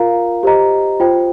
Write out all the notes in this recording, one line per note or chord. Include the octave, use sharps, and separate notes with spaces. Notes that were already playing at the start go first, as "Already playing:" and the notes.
Already playing: F4 A#4 F5 A#5
G4 C5 D#5 A#5
F4 C5 G5